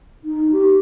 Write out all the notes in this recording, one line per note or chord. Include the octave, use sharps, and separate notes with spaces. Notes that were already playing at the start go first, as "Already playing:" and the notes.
D#4
G4